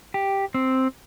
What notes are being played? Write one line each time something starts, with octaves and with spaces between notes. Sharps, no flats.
G4
C4